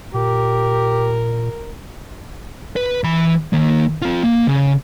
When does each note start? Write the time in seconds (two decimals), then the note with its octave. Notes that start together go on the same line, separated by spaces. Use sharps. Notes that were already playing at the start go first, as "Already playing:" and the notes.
0.14 A#2 G4 A#4
2.76 B4
3.04 E3 B5
3.53 D#3 A#3
4.02 C4 F4
4.23 A#3
4.47 C#3